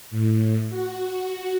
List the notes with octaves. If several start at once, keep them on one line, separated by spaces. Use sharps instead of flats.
A2
F#4